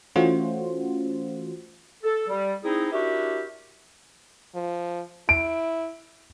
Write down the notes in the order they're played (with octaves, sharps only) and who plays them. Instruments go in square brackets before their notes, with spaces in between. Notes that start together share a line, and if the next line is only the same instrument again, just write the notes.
[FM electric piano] E3 A3 C#4 F4 F#4 C5
[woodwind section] A4
G3
C4 D#4 E4 G#4
D4 E4 F#4 G4 A#4 E5
[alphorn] F3
[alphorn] E4 [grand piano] D7